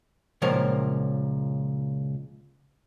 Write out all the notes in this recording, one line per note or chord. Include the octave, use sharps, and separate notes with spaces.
C#2 A#2 F3 A#4 C#5